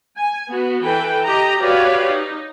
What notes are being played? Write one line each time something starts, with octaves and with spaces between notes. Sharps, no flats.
G#5
B3 F#4
E3 A4 B4 G5
G4 D#5 A#5
F#4 G4 B4 C#5 D5 F5
D#4